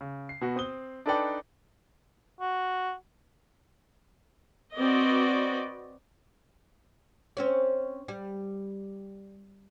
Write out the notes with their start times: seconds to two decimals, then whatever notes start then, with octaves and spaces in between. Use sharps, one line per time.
0.01 C#3
0.29 C7
0.41 B2 B3 F#4
0.56 C4 D#6 G7
1.06 D4 D#4 A4 B4 D5 G5
2.41 F#4
4.76 C4 F#4 B4 D5 D#5
7.37 C4 C#4 C#5
8.08 G3